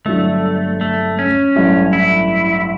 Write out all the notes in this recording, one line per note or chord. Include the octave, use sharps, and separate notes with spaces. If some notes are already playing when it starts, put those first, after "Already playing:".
G1 G2 F#3 A3
A3
C#4
A1 G2 F#3 A3
E4